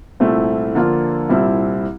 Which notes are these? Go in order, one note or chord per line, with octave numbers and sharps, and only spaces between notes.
C2 A#2 A3 C4 E4
D3 F3 A#3 D4 F4
C2 A#2 G3 C4 E4